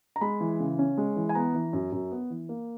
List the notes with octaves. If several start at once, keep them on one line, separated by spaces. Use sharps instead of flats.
A#5
G#3 B5
E3
C#3
C#4
G#3
E3
G#5
B3 A#5
E3
F#2
F#2
B3
E3
A#3